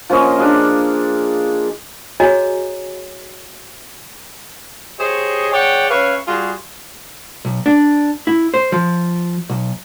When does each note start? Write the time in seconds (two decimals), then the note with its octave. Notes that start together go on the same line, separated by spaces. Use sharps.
0.10 F3 A#3 C#4 D#5
0.38 D4 G#4 F5
2.20 F#4 G#4 C#5 D#5 G#5 A#5
4.98 G4 G#4 C5 C#5 D#5
5.52 G#4 C#5 D5 F#5 G5
5.90 C#4 B4 C#5 E5 F5
6.27 G3 F4 F#4 G#4
7.45 B1
7.66 D4
8.27 E4
8.54 C5
8.72 F3
9.50 B1